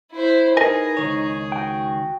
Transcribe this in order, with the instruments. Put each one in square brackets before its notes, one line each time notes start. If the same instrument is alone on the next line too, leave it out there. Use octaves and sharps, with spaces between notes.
[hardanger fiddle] E4 C5
[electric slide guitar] D#4 D#5 [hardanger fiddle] G#4 [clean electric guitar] A#4 B4 G#5
[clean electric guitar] C#2 D#3 C#5
[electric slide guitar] F#4 G5